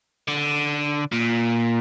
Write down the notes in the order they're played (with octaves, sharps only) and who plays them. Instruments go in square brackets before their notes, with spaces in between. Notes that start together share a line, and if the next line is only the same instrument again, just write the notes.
[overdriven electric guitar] D3
A#2